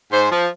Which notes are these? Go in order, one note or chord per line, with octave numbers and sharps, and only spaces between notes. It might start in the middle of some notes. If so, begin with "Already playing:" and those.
G#2 C5
F3